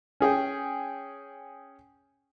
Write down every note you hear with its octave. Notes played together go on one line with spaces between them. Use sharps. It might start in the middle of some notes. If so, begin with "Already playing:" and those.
C#4 G#4 G5